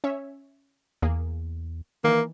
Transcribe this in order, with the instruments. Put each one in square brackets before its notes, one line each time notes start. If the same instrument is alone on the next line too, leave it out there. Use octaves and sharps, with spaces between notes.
[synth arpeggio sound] C#4 C#5 E5
[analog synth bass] E2 [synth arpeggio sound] A#3 G#4
[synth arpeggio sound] D#3 E3 [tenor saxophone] A#3